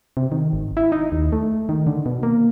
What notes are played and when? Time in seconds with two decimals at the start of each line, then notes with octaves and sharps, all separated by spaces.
0.17 C3
0.32 D#3
0.53 G#1
0.77 E4
0.92 D#4
1.12 D#2
1.32 A3
1.69 D#3
1.87 D3
2.06 B2
2.23 A#3